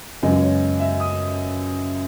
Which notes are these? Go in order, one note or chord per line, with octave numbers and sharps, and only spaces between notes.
F#2 C#3 G#3 B3 D#5
C#5
E5
D#6